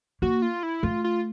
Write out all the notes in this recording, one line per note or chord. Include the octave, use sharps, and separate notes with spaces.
A#3 F#4
F4
E4
A3 F4
F4